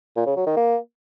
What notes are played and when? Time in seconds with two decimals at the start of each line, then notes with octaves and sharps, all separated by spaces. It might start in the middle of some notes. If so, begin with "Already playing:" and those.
0.16 A#2
0.26 C#3
0.36 F#3
0.46 D#3
0.56 A#3